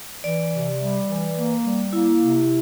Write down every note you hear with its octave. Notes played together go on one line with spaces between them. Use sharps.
E3 D5
C3
G3
E3
A#3
G3
A#3 E4
C3